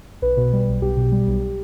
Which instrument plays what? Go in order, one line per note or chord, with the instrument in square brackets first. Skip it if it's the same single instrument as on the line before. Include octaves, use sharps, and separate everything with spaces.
[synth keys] B1 B4
B2
G3
B1
B1 G4
B2
G3
B1